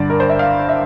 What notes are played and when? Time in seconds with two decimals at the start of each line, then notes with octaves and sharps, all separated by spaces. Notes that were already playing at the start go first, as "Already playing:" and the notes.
Already playing: G2 D3 D5
0.10 A#4
0.20 C5
0.29 E5
0.39 F5
0.69 E5